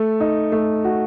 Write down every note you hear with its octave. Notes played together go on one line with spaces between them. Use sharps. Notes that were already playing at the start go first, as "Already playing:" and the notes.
Already playing: A3
D#4
A3
F#4